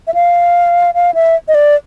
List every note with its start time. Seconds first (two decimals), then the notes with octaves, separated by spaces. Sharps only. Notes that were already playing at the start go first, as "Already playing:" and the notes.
0.07 E5
0.14 F5
0.95 F5
1.15 E5
1.48 D#5
1.55 D5